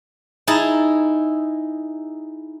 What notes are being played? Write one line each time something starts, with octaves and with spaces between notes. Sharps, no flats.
D#4 E4 G#4 A5 A#5